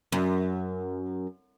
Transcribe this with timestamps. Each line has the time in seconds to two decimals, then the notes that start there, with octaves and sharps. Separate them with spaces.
0.12 F#2